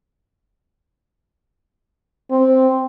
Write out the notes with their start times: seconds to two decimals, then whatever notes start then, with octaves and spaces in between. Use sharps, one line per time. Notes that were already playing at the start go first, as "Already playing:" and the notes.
2.31 C4